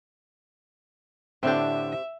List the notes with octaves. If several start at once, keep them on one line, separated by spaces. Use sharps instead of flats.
A2 D3 C4 D4 G4 E5